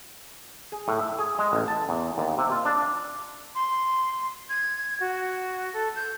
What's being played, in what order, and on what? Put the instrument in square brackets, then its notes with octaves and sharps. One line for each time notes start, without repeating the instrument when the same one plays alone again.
[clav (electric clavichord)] G#4
A2
E5
G#4
G#3
A1
A5
E2
D#2
C3
F4
D4
[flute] C6
G#6
F#4
A4
G6